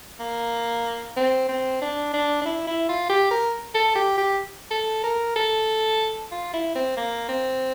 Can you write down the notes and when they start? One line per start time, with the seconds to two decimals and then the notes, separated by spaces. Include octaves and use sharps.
0.20 A#3
1.17 C4
1.49 C4
1.82 D4
2.14 D4
2.41 D4
2.45 E4
2.67 E4
2.89 F4
3.10 G4
3.31 A#4
3.75 A4
3.96 G4
4.18 G4
4.71 A4
5.03 A#4
5.36 A4
6.32 F4
6.54 E4
6.75 C4
6.97 A#3
7.29 C4